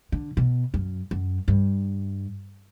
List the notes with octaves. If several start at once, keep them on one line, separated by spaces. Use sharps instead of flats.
D3
B2
F#2
F#2
G2